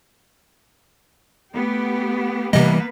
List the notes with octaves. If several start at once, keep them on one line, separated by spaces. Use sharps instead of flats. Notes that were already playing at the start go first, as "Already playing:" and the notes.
A3 B3 G4
C3 E3 G3 A#3 B3 B4 D#5